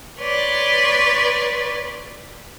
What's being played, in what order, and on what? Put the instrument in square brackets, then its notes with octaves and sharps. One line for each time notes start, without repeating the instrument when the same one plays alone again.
[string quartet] B4 C#5 D5 C6